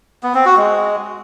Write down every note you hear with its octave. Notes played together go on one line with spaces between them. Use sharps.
B3
C4
F#4
G#3